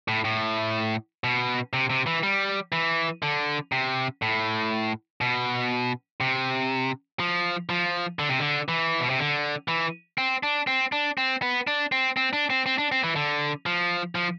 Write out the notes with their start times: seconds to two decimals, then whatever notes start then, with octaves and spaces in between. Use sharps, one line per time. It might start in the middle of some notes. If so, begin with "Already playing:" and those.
0.08 A2
0.25 A2
1.24 B2
1.73 C3
1.90 C3
2.06 E3
2.23 G3
2.72 E3
3.22 D3
3.72 C3
4.22 A2
5.21 B2
6.20 C3
7.20 F3
7.69 F3
8.19 D3
8.29 C3
8.39 D3
8.68 E3
9.00 B2
9.10 C3
9.19 D3
9.68 E3
10.18 C4
10.43 D4
10.67 C4
10.92 D4
11.18 C4
11.42 B3
11.67 D4
11.92 C4
12.17 C4
12.33 D4
12.50 C4
12.66 C4
12.78 D4
12.92 C4
13.04 E3
13.16 D3
13.66 F3
14.15 F3